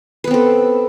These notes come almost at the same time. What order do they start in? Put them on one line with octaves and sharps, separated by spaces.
B4 B3 C4 A4